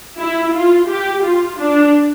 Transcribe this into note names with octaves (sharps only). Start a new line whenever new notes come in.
E4
F4
G4
F4
D4